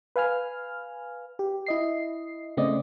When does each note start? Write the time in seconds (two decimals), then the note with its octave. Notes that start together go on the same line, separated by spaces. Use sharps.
0.16 B4 F5 G#5 F6
1.39 G4
1.66 E4 D#5 C7
2.57 C#3 A3 C4 D5 D#5